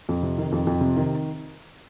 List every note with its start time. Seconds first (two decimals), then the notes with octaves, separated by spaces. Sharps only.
0.09 F2
0.23 C3
0.38 D#3
0.52 F2
0.67 F2
0.81 C3
0.96 D#3